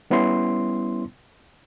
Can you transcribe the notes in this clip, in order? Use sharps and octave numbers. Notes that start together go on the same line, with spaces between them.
G3 B3 C#4 E4 C6